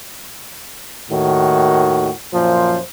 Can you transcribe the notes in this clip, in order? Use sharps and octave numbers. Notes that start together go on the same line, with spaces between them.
D#2 A2 D#3 F#4
F#2 A#2 F3 C5